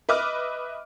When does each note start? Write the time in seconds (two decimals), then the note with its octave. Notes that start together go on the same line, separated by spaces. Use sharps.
0.09 B4 D#5 E5 D6 F6